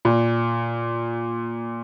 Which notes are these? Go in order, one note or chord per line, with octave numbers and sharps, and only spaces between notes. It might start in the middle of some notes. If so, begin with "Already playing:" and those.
A#2